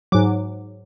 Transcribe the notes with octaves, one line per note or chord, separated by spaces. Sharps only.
G#2 F#3 D6